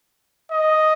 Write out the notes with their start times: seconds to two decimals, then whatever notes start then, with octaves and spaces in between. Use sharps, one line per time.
0.51 D#5